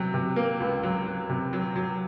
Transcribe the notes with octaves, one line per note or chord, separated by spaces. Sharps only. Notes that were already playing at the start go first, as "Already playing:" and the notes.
Already playing: C3 F#3
C3
A#3
C#2
F#3
F#3
C3
F#3
F#3